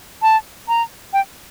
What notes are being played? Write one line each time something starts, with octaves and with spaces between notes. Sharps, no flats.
A5
A#5
G5